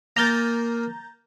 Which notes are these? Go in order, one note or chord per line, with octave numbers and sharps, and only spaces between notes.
A#3 A#4 G#5 A#5 G6 A6